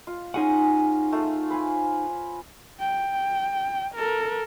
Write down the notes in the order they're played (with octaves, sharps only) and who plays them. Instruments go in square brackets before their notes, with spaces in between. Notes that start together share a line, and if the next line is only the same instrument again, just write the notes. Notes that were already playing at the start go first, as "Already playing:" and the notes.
[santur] F4
[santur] C#4 C6 [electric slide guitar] D#4 G#4 F#5
[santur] A3 F4
B4 C5 G#5
[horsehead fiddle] G5
A4 A#4